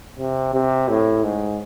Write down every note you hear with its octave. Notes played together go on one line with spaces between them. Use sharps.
C3
C3
A2
G#2